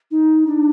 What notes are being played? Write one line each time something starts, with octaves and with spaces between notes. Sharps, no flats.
D#4
D4